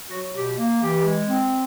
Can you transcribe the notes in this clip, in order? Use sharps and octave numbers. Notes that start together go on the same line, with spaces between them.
F#3 F#4
B2 G4
A#3
E3 G4
G#3
C4